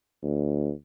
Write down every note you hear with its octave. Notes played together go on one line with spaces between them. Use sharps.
D2